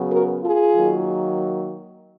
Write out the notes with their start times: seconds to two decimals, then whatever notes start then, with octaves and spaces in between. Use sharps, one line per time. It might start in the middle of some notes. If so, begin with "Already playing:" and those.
Already playing: C#3 F#3 B3
0.09 F#4 A#4
0.42 F4 G#4
0.74 D#3 F#3 A#3